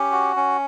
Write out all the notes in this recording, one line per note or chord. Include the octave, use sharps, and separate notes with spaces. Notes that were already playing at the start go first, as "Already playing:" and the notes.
Already playing: C#4 G4
F#4
C#4